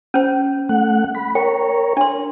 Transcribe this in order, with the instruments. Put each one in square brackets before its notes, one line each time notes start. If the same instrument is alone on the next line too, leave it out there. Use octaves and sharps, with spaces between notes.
[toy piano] C#4 C5
[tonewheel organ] A3 F#5
B5
[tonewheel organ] A#4 C#5 [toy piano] G5
[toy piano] D4 C6